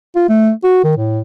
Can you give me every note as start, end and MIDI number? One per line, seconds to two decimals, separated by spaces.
0.16 0.26 65
0.29 0.51 57
0.64 0.81 66
0.84 0.96 51
0.97 1.21 45